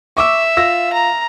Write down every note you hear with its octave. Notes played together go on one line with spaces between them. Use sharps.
E5 C#6 D6 E6
F4 E6 A#6
A#5